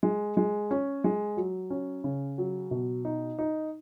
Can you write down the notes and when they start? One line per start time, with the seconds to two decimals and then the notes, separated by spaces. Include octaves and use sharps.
0.03 G#3
0.37 G#3
0.71 C#4
1.04 G#3
1.37 F#3
1.70 C#4
2.04 C#3
2.38 F#3
2.71 B2
3.05 D#4
3.39 D#4